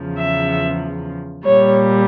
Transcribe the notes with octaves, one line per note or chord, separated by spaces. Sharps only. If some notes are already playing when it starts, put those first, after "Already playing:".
Already playing: E2 C#3 F3
E5
A#2 G3 C#5